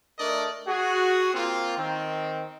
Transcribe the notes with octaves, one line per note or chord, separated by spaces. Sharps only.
A3 D4 A#4 D5 D#5
F#4 G#4
A#3 C4 F4
D#3 C4